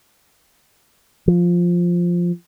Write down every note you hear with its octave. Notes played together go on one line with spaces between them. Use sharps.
F3